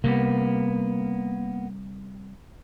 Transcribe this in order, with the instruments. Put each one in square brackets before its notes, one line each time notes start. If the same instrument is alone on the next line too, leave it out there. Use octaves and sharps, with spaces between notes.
[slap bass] C3 G3 [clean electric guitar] A#3 B3